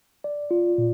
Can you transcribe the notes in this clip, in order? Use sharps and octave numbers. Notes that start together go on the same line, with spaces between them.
D5
F4
A#2